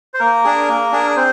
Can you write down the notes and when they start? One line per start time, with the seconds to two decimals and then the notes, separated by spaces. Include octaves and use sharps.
0.14 C5
0.20 A#3 A#4
0.44 D4 G#4
0.69 A#3
0.92 D4 G#4
1.16 C4 C5